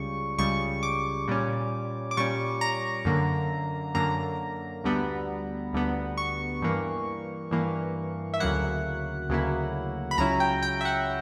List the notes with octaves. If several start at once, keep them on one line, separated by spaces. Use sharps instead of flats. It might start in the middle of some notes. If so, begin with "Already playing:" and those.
Already playing: C#2 C#3 G3 C#6
C#2 C#3 G3 C#6
D6
A#2 G3 C#4
D6
A#2 G3 C#4 C#6
A#5
F#2 D3 A#3
F#2 D3 A#3 A#5
D2 D3 G3 B3
D2 D3 G3 B3
C#6
G2 E3 A#3
G2 E3 A#3
E5
D2 C#3 F#3 A#3 E4 F#5
D2 C#3 F#3 A#3 E4
B5
C#2 C#3 F#3 C#4 E4 A#5
G5
G5
E5
F#5